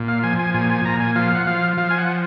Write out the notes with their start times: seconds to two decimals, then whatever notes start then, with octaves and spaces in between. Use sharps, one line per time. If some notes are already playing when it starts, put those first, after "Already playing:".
Already playing: A#2
0.08 F5
0.23 F3 G#5
0.39 G#5
0.54 A#2 G#5
0.70 G#5
0.85 A#2 A#5
1.00 G#5
1.15 F3 F5
1.35 F#5
1.47 F3 F5
1.77 F3 F5
1.90 G#5
1.98 F#5